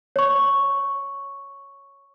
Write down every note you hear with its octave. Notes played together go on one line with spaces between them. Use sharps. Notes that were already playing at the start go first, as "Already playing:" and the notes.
C#5 C#6